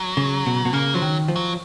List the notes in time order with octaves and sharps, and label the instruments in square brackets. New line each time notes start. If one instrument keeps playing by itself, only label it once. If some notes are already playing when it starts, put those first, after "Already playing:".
Already playing: [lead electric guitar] F#3
[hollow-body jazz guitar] C#3
B2
B2
[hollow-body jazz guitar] C#3 [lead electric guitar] A#3
[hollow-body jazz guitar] F3 [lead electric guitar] F#3
[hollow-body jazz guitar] D#3
F3
[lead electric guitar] F#3